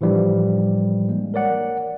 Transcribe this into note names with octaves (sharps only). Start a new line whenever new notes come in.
A2 E3 F3 G3 D4
G#3 A#3
A#4 C#5 D5 F#5